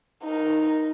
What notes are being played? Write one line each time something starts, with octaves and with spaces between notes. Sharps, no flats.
D#4 A#4